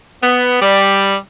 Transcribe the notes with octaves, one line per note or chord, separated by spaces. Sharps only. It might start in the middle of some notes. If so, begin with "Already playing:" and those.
B3
G3